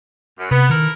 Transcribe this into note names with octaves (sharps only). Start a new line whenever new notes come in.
F#2
C3 B3
D#3 E4 A4 A#4